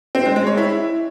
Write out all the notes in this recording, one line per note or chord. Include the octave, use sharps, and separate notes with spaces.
C4
G#3
G#3
C#5
E4